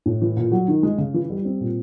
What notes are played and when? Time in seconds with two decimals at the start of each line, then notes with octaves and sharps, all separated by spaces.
0.06 A2
0.22 E3
0.37 A#2
0.52 F#3
0.68 D#3
0.83 G#3
0.98 C#3
1.14 E3
1.30 G3
1.45 C4
1.61 A#2